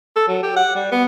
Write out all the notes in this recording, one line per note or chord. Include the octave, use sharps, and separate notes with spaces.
A4
F#3
G4
F#5
G3
B3